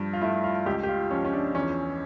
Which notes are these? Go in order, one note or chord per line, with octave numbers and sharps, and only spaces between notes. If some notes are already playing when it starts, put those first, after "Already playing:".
Already playing: G2 F3
F4
A3 E4
F4
C#2 G4
G4
F4
F3 C#4
C#4
D4
E2 C#4